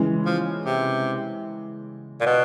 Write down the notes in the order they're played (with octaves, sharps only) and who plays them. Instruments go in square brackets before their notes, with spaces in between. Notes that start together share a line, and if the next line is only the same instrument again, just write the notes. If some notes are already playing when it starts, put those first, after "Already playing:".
Already playing: [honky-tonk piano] C#3 E3 G#3
[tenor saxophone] F3
C3
A#2
B2